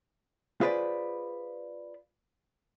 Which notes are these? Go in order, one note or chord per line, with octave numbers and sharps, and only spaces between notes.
F4 G#4 B4 C5 D5